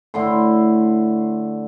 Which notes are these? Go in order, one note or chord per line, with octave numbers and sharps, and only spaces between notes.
A2 D3 C6